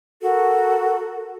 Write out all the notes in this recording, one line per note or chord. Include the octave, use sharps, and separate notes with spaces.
F#4 A4 A#4